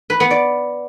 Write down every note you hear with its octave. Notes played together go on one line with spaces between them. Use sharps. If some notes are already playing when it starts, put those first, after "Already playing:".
B4
B3
D5